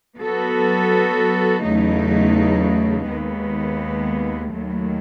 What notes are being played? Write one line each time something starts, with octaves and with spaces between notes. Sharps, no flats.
F#3 B3 F#4 A4
E2 C#3 F#3 A3 D#4
D#2 D#3 G#3 B3
D#2 D#3 F#3 A3